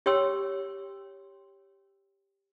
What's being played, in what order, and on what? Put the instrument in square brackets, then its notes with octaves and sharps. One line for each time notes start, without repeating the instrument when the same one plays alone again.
[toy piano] G4 C#5 G5 C6 E6